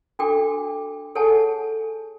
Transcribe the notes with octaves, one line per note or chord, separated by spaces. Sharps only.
D4 F#4 A4 G5 D6
G#4 A4 C#5 F#5 G#5 A5